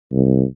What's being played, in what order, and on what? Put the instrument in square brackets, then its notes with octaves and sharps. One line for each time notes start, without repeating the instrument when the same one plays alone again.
[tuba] C2